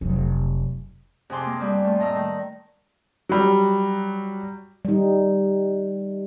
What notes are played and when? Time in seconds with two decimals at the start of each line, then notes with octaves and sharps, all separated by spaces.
0.01 F1 F#3
1.30 F2 C3 G#4 G#5 C6 D6
1.46 A#3
1.60 F2 G3
1.84 A3 F4
1.99 A2 D#5 A#5 E6
2.15 D#3
3.29 F#3 G3
4.85 G3 D#4